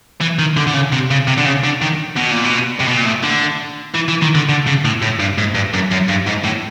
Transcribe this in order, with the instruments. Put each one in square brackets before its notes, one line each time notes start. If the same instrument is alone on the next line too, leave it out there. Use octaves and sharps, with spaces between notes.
[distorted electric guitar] E3
D#3
D3
D3
C#3
C3
C#3
C3
D3
C#3
D3
D#3
B2
A#2
B2
C3
B2
A#2
A2
D3
E3
E3
D#3
D3
D3
C#3
A2
A2
G2
G#2
G2
F#2
F#2
G2
G#2
A2